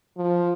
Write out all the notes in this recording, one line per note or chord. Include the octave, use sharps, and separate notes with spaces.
F3